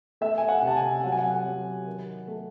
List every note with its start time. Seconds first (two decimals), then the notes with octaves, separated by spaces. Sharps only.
0.21 A3 E5
0.38 G#5
0.49 F#5
0.62 C3
0.67 A5
0.77 G#5
1.04 F#3 F#5
1.12 G#5
1.19 F#5
1.46 F#3
1.87 D#3
2.27 A3